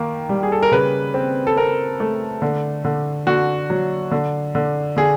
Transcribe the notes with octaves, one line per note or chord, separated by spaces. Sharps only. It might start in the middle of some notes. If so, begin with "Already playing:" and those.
Already playing: D#3 A#3
G3
G#4
A4
A#4
C#3 B4
C4
A4
C4 A#4
A3
D3
D3
D3 F#4
F#3
D3
D3
D3 G#4